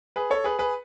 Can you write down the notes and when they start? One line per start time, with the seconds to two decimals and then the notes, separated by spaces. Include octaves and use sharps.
0.16 G#4 B4
0.30 A4 C#5
0.44 G#4 B4
0.59 G#4 B4